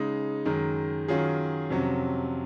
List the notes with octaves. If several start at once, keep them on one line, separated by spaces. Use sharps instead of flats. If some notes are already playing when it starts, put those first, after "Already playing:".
Already playing: C#3 G#3 D#4
F#2 D#3 G#3
D#3 F#3 C#4 F4 G#4
F2 C3 F#3 C#4